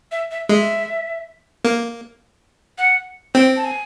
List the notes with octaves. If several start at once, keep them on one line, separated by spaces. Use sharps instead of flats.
E5
E5
G#3 E5
A#3
F#5
C4 G5
A5
G#5